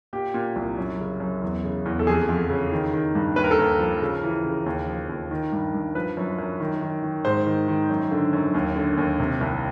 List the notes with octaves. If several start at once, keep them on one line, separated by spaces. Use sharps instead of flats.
A#2 G4
A#2
C2
F#2
C#3
F#2
E2
C#3
E2
A4
F2 G#4
F2
C#3
D#3
D#3
G2
D#2 B4
A#4
A4
D#2 A#4
F3
C#3
E3
C#3
D#2
F3
D#2
D#3
G2
G2
F3 B4
F#2
F#2
D#3
D#3
D#3
G#2 C5
D#3
D#3
F#2
D3
F#2
D#2
D3
D#2
C3
C2